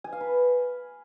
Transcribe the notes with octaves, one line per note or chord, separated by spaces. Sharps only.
G#5
F5
B4